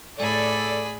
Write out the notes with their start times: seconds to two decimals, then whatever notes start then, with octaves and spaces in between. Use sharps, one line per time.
0.19 A2 G#4 A4 D5 B5